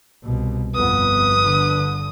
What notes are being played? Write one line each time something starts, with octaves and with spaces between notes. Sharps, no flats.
C2 B2
G1 F2 B3 B4 D#6
D3